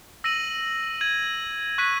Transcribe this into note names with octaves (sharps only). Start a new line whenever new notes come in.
E6 A#6 D#7 F#7
G#6 D#7 F#7
C#6 F#6 B6 D#7